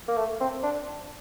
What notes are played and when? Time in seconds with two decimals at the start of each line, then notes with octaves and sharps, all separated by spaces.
0.08 A#3
0.17 A3
0.41 C4
0.63 D4